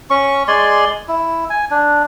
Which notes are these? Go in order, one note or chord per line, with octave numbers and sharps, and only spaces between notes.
C#4 C#6
G#3 D5 G#5 C6
E4
G#5
D4